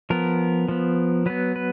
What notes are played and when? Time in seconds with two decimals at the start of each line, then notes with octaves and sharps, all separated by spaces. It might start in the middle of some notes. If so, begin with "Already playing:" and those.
0.10 F3 B3 A#4
0.68 F3 B3
1.26 F#3 B3 B4
1.56 B4